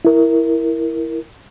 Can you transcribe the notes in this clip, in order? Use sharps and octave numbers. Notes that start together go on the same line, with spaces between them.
E4 A#4